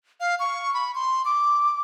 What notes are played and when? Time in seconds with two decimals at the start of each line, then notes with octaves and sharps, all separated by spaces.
0.20 F5
0.40 C#6
0.74 B5
0.95 C6
1.25 D6